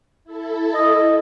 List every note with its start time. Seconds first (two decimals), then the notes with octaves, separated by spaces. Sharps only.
0.24 E4 A4
0.74 D#5